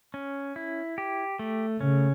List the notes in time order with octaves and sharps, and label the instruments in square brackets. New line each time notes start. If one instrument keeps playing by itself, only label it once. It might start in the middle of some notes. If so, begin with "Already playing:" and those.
[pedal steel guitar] C#4
E4
G4
A3
[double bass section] C#3 [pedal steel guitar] C#4